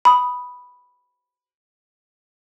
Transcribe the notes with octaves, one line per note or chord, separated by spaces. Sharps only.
B5 D#6